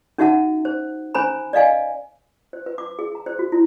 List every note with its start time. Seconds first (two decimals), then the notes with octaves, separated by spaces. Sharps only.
0.18 C#4 D#4 F#4 E5 F#5 A5
0.65 C5
1.15 C#4 C5 G#5 A#5 B5
1.53 D5 D#5 F5 G#5
2.53 C5
2.66 B4
2.78 D6
2.99 G#4
3.15 A#5
3.26 C5
3.39 F#4
3.52 E4